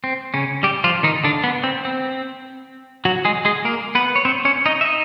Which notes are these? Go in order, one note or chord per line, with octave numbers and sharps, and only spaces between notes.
C4
C#3 C#4
G3 G4
F3 F4
D#3 D#4
D3 D4
B3
C4
C4
F#3 F#4
G#3 G#4
G#3 G#4
A#3 A#4
B3 B4
C#5
C4 C5
C#4 C#5
D#4 D#5
E5
D#4 D#5